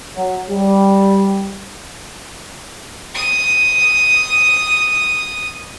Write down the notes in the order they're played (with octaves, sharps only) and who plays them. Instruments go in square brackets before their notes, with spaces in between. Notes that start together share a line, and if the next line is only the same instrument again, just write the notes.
[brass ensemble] F#3
G3
[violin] D#6 D#7